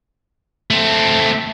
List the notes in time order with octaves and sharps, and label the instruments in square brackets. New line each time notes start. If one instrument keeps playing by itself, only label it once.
[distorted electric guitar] A3 C4